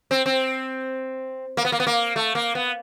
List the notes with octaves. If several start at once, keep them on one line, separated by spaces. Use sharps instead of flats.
C4
C4
A#3
B3
A#3
B3
A#3
A3
A#3
B3